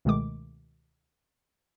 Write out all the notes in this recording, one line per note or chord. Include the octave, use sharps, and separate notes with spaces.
C#2 B2 D#3 G#3 A3 D6